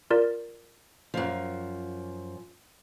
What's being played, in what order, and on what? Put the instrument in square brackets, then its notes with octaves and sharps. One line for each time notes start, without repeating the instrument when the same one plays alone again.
[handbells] F4 A#4 D5
[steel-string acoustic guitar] F#2 F3